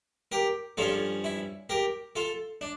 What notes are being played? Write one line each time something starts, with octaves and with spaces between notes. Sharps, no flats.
G4 A#4
G2 F3 C#4 F4 A4
E4
G4 A#4
F4 A4
D4